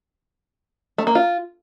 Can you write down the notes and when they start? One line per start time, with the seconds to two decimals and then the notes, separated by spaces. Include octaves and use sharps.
0.98 A3
1.07 A#3
1.15 F4